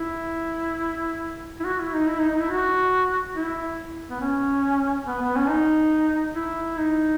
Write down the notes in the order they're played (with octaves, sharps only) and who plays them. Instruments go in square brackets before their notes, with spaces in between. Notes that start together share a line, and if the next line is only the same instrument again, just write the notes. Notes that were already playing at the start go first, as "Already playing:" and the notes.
Already playing: [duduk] E4
E4
F#4
E4
D#4
E4
D#4
D#4
E4
F#4
E4
B3
C#4
B3
B3
C#4
D#4
E4
D#4